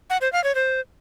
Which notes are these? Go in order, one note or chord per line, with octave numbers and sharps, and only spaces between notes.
F#5
C5
F5
C#5
C5